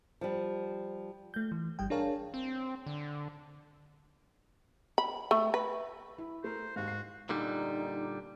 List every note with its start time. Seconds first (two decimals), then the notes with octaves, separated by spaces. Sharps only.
0.21 F3 G3
1.34 A3 G6
1.52 E3
1.79 G1 G3 G5
1.90 D4 G#4 A#4 C#5 F5 A5
2.34 C4
2.86 D3
4.98 B5
5.31 A3
5.54 B4
6.18 E4
6.44 A3 A#4 C5
6.76 D#2 G#2 F#4 F5
6.88 C7
7.29 A#2 D3 G3 D#4